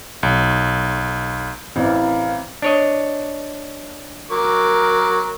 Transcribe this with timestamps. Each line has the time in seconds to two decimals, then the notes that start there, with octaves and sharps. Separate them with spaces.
0.23 B1
1.76 A1 C4 E4 A#4 D5 F5
2.62 D4 C#5 D#5
4.31 F#3 A#4 D6